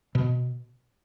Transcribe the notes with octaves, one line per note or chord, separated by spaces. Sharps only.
B2